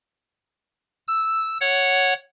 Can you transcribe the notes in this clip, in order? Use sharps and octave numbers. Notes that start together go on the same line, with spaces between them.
E6
C#5 F#5